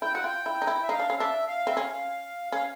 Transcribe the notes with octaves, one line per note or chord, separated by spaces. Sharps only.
E4 G5
F#4 F#5
F4 G5
E4
D#4
E4
E5
D#4 F5
D4
C#4
D4 E5
F5
C4 E5
C#4 F5
C#4 F5